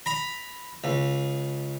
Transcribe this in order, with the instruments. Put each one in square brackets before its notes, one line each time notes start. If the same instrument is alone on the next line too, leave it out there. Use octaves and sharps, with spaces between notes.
[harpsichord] A#5 B5
C#2